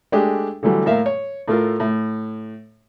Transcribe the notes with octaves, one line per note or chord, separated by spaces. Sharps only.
G#3 A3 D4 G4 G#4
D3 E3 F#3 G3 A3
A2 A#3 E5 F5
C#5
A2 A3 F4 A#4
A2